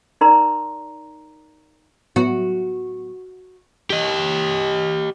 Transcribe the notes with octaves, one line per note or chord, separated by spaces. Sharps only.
D#4 A#4 D5 A#5 C6
A2 F#3 B3 F#4
G4 D#5